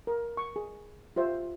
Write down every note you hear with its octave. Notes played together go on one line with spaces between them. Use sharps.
A#4
C#6
G#4
F4 G4 C5 E5